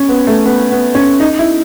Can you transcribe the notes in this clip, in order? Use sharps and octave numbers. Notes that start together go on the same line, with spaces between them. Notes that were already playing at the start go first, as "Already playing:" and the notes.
Already playing: C#4
B3
A3
B3
B3
C#4
D#4
E4